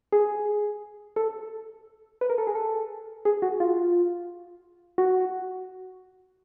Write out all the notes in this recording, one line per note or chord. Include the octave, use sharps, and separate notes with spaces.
G#4
A4
B4
A#4
A4
G#4
A4
G#4
F#4
F4
F#4